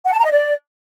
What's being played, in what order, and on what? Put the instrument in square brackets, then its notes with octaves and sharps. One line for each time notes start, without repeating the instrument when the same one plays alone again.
[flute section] F#5
A5
A#5
D#5
D5